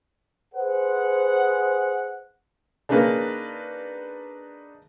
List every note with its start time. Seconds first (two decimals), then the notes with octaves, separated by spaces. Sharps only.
0.55 G#4 B4 C5 F#5
2.89 C#3 A#3 D4 D#4 B4